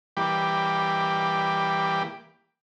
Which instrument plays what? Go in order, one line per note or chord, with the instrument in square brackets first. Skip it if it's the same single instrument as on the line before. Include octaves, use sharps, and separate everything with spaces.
[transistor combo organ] E3 G3 A#3 G5 B5 D6